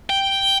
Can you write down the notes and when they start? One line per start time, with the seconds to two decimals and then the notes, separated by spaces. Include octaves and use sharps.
0.10 G5